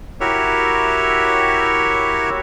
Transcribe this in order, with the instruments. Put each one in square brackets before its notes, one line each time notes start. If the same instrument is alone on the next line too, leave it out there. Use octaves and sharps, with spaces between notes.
[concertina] E4 F#4 G4 A#4 C#5 E5